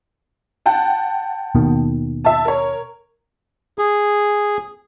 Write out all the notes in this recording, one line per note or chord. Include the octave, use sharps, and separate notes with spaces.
F#5 G5 A5
D#2 B2 D#3
E5 A5
A#4 C#5
G#4